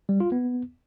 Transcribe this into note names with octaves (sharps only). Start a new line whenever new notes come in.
G3
F4
B3